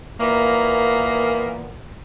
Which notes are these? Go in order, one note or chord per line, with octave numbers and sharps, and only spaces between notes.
A#2 E3 A#3 B3 A#4